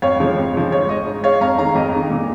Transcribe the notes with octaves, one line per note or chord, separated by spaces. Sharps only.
F2 C#5 F5
C#3 F3 G#3
F2
C#3 F3 G#3
G#2 C#5
G#3 D#5
G#2
G#3 C#5 F5
F2 F5 A#5
D#3 G#3 F5 A#5
F2 D#5
D#3 G#3
A#2